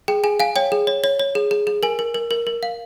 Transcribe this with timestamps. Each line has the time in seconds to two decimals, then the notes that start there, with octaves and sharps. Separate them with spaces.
0.08 G#4 G5
0.24 G#4 G#5
0.40 F5 G#5
0.56 C#5 G5
0.72 G#4
0.87 C#5
1.04 C#5
1.19 C#5
1.35 G#4
1.51 G#4
1.67 G#4
1.83 A#4 G#5
1.99 A#4
2.15 A#4
2.31 A#4
2.47 A#4
2.63 F5